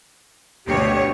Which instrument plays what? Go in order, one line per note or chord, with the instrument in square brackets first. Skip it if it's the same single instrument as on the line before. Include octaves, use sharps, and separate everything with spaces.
[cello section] D2 B2 C#5 [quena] G4